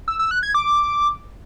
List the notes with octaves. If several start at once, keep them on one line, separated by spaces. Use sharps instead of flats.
E6
E6
F#6
G#6
D6